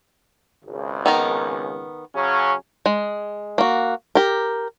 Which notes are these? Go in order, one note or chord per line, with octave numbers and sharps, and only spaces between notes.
G#1 C#2
D#3 B3 A#4
C#3 F#3 C#4
G#3
A#3 F#4
G4 A#4